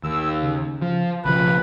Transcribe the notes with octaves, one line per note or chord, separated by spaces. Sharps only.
D#2 E6
C#3
F3
B1 C#3 F3 B4